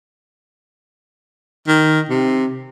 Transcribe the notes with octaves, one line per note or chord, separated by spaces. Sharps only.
D#3
C3